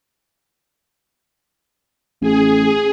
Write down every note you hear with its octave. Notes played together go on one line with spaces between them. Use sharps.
A1 G#4